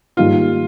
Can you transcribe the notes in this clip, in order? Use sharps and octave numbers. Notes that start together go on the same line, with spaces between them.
G#2 D#3 G3 A#3 D#4 F4